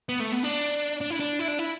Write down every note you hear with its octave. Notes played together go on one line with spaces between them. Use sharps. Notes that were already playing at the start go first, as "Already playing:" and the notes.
B3
A3
B3
D4
D4
E4
D4
E4
D4
E4